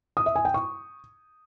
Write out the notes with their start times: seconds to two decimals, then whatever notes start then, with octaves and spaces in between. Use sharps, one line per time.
0.17 D#6
0.26 E5
0.36 G#5
0.45 G5
0.54 C#6